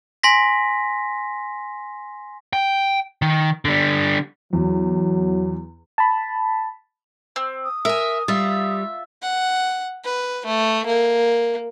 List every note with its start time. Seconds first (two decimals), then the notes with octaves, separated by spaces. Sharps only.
0.23 G#5 C6 A#6 B6
2.53 G5
3.22 D#3
3.65 D3 G3
4.53 E2 F#3
5.98 A5 B5
7.36 C4
7.64 D#6
7.85 A#4 E5 G#5
8.28 G3 F4 E5
9.22 F#5
10.05 B4
10.46 A3
10.86 A#3